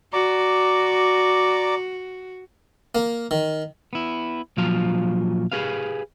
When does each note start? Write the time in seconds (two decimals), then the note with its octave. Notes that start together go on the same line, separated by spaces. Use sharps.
0.13 F#4 D5 A#5 D6
2.95 A#3
3.31 D#3
3.93 B3 E4
4.57 A#2 F3 F#3 F4 F5
5.52 G4 G#4 B4 F5